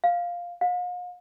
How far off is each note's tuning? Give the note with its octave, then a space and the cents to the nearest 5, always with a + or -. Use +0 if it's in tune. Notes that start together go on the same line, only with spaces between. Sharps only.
F5 +5
F5 +45